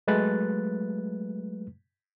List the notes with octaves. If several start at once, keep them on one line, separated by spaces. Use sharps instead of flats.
F#3 G#3 A3 B4 F#6 A6